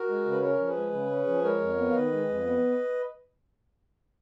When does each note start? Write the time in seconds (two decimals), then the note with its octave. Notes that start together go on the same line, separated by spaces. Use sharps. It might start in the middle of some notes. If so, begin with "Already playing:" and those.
Already playing: F#4 A#4
0.09 G#3
0.25 C#3
0.31 B4
0.42 C#4 A#4 C#5
0.59 F3
0.68 G#4 B4
0.76 G#3
0.92 C#3
1.10 C#4
1.27 F3
1.44 G#3 A#4 C#5
1.61 F2
1.77 B3
1.91 F5
1.95 D#3 B4 D#5
2.12 G#3
2.29 F2
2.45 B3